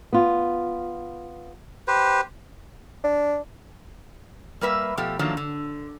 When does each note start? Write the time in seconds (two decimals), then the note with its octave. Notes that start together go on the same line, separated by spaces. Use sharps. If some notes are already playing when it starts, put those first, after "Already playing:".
0.13 B3 F4
1.88 G4 B4 C5
3.04 D4
4.61 G3 A#3 B4 E5
4.97 B2 F3 A3 G4
5.19 D#3 F3 F#3 A3 A#3 D4
5.37 D3